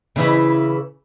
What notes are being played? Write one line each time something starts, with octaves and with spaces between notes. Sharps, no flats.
C#3 E3